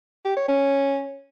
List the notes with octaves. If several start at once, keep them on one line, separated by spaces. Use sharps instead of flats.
G4
C#5
C#4